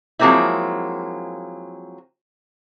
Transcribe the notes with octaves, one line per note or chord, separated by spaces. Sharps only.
F3 F#3 G#3 A#3 C4 E4